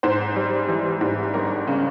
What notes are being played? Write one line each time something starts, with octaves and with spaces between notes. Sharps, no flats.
G#2 C5
G3
E3
G#2
G1 A#4
C#3